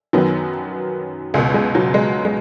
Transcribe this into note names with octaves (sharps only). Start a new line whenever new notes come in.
F#2 D#3 F#3 B3
C#2 B2 G#3
G#3
F#3
G#3
G#3